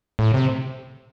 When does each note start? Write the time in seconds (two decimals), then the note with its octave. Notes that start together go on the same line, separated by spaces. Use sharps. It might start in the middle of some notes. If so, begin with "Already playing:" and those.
0.19 A2
0.34 C3